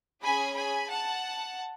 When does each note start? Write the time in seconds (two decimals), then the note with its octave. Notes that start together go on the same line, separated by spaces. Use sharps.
0.22 C#4 G#4 G#5 B5
0.56 G#5 B5
0.89 F#5 A5